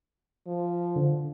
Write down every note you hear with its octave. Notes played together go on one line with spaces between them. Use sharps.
F3
D3